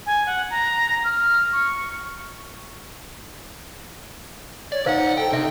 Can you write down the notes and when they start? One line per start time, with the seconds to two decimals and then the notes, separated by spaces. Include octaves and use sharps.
0.06 G#5
0.26 F#5
0.51 A#5
1.04 F6
1.53 C#6
4.72 C#5 D5
4.86 C#2 D#4 C5 F5 F#5
5.17 A4 G5
5.32 C3 D4 D#4 E5